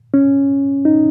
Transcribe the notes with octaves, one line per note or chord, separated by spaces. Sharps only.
C#4
D#4